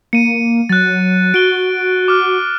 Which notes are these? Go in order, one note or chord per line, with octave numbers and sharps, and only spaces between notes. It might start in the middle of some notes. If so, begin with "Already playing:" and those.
A#3 C#7 D#7
F#3 F#6 A6
F#4 D7 G7
D6 F6